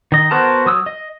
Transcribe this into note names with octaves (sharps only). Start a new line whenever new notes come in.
D#3 D#5
B3 F#4 A#4 C5 A5
F#3 D#6 E6
D#5